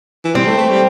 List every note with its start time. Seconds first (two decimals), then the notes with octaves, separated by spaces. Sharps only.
0.24 E3
0.35 G3 C4
0.47 A3
0.57 A3
0.70 G3